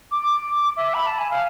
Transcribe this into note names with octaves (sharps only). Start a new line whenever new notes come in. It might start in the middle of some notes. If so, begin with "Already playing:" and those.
D6
E5
B5
A5
G#5
F5